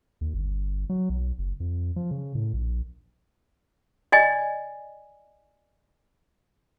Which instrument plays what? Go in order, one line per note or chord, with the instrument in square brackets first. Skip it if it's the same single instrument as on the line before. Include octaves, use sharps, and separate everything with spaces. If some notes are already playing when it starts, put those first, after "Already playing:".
[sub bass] D#2
G1
F#3
B1
F#1
F2
F3
C#3
A2
A#1
[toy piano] D5 D#5 G#5